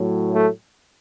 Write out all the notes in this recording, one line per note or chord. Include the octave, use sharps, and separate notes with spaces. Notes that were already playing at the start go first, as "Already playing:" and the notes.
Already playing: A2 F#3
A3